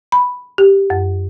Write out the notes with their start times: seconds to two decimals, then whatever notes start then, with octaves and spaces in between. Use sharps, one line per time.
0.12 B5
0.58 G4
0.90 F#2